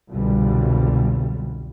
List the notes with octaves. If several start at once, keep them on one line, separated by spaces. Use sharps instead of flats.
C2 F2 B2 D3 F#3 G3